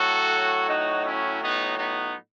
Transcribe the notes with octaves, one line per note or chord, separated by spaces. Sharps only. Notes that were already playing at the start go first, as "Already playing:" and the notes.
Already playing: A2 F#3 F#4 A4
D#4 F#4
C#4 E4
B3 D#4
B3 D#4